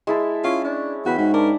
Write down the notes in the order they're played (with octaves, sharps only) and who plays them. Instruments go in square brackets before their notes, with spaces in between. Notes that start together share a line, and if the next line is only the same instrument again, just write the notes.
[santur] G#3 E4 A5
[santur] C#4 [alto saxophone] F4
[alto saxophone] D4
[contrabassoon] E2 [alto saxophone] F#4 [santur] G5 B5
[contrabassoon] G#2 [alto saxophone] F#4
[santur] D4 [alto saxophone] A#4